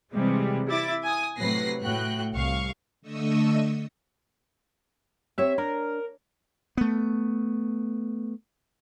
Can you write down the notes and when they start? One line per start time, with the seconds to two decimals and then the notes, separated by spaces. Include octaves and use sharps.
0.13 C3 E3 G3 G#3
0.68 E4 E5 D6 A6
1.04 G#5 D#6
1.38 A2 C3 F#3 B4 A#6 C7
1.82 A2 F#4 G5 F#6
2.34 C2 F5 C#6
3.02 D3 A3 D#5 C#6 D#6 E6
5.38 C4 G4 C#5 E5
5.58 D4 A#4
6.77 A3 B3